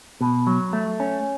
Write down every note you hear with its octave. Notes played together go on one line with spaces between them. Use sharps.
B2
F#3
A3
C#4